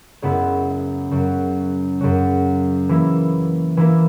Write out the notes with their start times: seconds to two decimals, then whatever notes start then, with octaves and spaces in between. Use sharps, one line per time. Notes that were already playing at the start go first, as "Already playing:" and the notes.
0.22 F#2 C#3 G#3 B3 E4
1.11 F#2 C#3 F#3
2.01 F#2 C#3 F#3
2.89 E3 A#3 E4
3.77 E3 A#3 E4